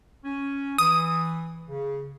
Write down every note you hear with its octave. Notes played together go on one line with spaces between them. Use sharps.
C#4
E3 D#6
C#3